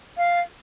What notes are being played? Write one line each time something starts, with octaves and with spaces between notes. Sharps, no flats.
F5